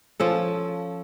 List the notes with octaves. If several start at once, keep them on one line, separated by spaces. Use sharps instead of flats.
F3 C#4 A4